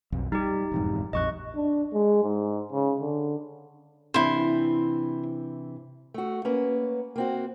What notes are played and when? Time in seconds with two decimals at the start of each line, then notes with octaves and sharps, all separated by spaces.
0.12 B1 F2
0.32 G3 D#4 G4
0.72 E1 F2 G#2
1.13 A#1 F2 D#5 C#6 F#6
1.56 D4
1.94 G#3
2.24 G#2
2.72 C#3
3.01 D3
4.14 C3 E3 D4 E4 C5
6.14 A3 F#4
6.45 A#3 C#4 B4
7.16 A#3 C4 F#4